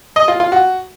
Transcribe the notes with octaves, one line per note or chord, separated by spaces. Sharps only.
D#5
F4
F4
F#4